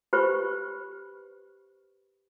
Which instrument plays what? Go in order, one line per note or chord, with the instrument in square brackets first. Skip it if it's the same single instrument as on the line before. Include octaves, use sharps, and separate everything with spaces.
[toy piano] G4 B4 C5 B5 C#6